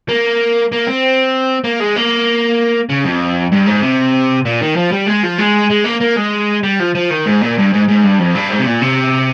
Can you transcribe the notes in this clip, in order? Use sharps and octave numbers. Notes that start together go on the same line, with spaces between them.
A#3
A#3
C4
A#3
G#3
A#3
C#3
F2
G2
G#2
C3
A#2
D#3
F3
G3
G#3
F3
G#3
G#3
A#3
A#3
G#3
G3
F3
F3
D#3
G#2
A#2
G2
G#2
G#2
G2
F2
G2
G#2
C3
A#2
C3